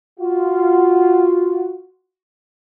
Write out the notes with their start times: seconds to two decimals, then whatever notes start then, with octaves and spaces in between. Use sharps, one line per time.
0.19 F4 F#4